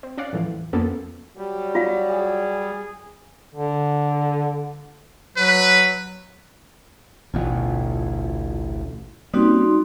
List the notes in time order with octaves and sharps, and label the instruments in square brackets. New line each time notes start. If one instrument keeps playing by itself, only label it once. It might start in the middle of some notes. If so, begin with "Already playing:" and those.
[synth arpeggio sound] C4
C#4 D5 F5 F#5
E2 A2 E3 F3
F2 F3 A#3 B3 C#4 A4
[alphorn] F#3 [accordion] G3
[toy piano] F4 F5
[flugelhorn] G#4
[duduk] D3
[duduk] F#3 [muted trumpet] B4
[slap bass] A1 D2 [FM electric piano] B2 [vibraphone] F4
[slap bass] G3 [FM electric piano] A#3 C4 C#4 [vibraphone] D#4 F#4 C6